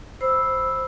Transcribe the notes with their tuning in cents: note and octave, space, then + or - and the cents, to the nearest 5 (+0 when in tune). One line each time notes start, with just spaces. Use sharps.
C5 +0 B5 +0 E6 +0